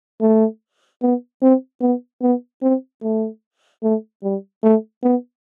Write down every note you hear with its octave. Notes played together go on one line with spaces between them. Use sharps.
A3
B3
C4
B3
B3
C4
A3
A3
G3
A3
B3